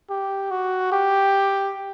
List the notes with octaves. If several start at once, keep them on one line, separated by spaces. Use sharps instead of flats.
G4
F#4
G4